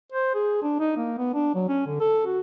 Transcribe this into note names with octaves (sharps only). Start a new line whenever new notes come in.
C5
G#4
D4
D#4
A#3
B3
D4
F#3
C#4
D3
A4
F#4